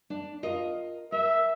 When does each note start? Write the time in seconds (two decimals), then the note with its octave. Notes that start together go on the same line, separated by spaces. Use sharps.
0.10 D4
0.43 F4 A#4 D#5
1.12 A#4 E5